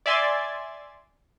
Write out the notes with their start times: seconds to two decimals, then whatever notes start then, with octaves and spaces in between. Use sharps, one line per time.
0.06 D5 E5 G#5 C6 G#6 A6